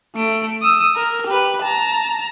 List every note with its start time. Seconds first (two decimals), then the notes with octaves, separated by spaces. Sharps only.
0.16 A3 D7
0.62 D#6 E6
0.96 A#4
1.27 G4 B4
1.62 A5 A#5